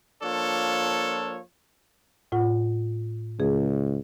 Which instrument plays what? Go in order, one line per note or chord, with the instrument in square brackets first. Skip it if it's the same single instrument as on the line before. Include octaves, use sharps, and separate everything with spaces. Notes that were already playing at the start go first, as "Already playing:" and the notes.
[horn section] F3 A#3 D4 F4 A4 C#5
[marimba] A2 F4 F#5
[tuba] C#2 [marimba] G#4